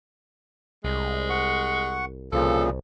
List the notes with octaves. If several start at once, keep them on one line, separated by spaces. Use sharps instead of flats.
C2 G#3
F#5 C#6
C2 A#2 C#3 F3 A4